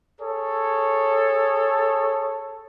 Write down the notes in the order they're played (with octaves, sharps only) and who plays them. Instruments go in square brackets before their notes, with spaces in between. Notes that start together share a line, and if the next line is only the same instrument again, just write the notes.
[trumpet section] G#4 A4 C#5